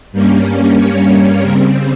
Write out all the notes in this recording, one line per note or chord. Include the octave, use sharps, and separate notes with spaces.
G2 G3 A#3 C#4
C#5
C#5
C#3 G3 C4 A#4